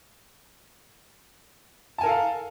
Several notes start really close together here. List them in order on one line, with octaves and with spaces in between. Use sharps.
A5 G#5 A#4 A4 F5